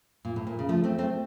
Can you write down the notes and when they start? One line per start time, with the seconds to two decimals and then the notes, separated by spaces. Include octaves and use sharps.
0.25 A#2
0.36 A2
0.47 A#2
0.59 C#3
0.69 F3 A3
0.84 A3 C4
0.98 A3 C4